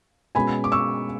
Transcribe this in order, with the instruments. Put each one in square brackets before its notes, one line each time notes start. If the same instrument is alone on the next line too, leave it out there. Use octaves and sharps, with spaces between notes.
[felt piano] B2 G#3 C#4 G#5 B5
D6
C#6 E6